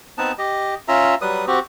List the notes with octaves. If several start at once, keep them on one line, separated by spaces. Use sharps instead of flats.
B3 C4 D#4 A5
G4 D#5
C#4 F4 E5 A#5
F#3 G3 B4 D#6
C4 F#4 G4